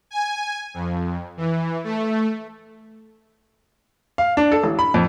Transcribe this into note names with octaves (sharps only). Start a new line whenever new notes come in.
G#5
F2
E3
A3
F5
D4
A4
A1
B5
F2